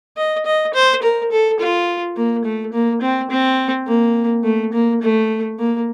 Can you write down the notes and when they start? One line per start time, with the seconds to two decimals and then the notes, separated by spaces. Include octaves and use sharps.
0.17 D#5
0.46 D#5
0.74 C5
1.02 A#4
1.31 A4
1.59 F4
2.16 A#3
2.45 A3
2.73 A#3
3.02 C4
3.30 C4
3.87 A#3
4.44 A3
4.73 A#3
5.02 A3
5.59 A#3